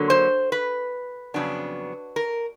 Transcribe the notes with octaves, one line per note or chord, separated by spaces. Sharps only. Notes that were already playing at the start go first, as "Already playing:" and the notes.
Already playing: D3 F#3 A#3
C5
B4
F2 C#3 F#3 B3 D4
A#4